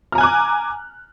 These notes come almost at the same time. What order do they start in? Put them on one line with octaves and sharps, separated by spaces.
F6 A#5 G#5 F#6 D6